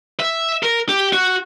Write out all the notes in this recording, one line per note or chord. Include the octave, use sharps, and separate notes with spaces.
E5
A#4
G4
F#4